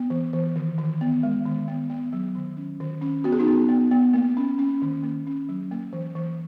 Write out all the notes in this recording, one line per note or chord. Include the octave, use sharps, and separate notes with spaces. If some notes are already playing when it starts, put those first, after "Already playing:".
Already playing: B3
E3
E3
D#3
D#3
B3
G#3
D#3
B3
B3
F#3
D#3
C#4
D#3
C#4
B3 F#4
G#4
D#4 F#4
B3
B3
B3
A#3
C#4
C#4
D#3
A#3
C#4
F#3
A#3
E3
E3